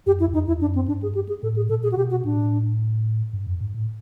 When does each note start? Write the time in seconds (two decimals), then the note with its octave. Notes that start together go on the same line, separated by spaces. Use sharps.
0.06 F#2 G4
0.20 F2 E4
0.28 E2
0.33 F2 D#4
0.47 E2 E4
0.61 F#2 D4
0.75 C4
0.88 G2 D4
1.02 G#4
1.15 G4
1.28 G#4
1.43 A2 A4
1.56 G#4
1.69 A#2 A4
1.83 G#4
1.92 F#4
1.97 B2 G4
2.11 F#4
2.24 A2 D4
3.33 G2
3.46 F2
3.60 G#2
3.74 A2